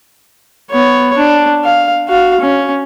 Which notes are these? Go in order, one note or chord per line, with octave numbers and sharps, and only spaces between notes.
B3 C#5
D4
F5
F#4 F5
C#4